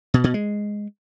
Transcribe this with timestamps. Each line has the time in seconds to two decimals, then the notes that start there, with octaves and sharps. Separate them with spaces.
0.14 B2
0.24 B2
0.34 G#3